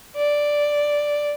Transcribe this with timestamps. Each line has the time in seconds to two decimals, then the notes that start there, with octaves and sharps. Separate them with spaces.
0.16 D5